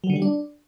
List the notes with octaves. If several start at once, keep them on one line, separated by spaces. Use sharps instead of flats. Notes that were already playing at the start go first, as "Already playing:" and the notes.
F#3
D3
G3
D4